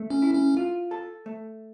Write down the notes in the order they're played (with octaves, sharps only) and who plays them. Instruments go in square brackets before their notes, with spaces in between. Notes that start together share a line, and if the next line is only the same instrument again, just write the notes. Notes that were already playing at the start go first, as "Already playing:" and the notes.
Already playing: [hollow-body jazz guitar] A3
[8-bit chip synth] C#4
[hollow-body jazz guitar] E4
[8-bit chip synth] C#4
[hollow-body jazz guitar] F4
A4
A3